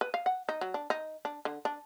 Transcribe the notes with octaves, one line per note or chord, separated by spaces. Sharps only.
B4
F5
F#5
D#4
F#3
D4
D#4
D4
D3
D4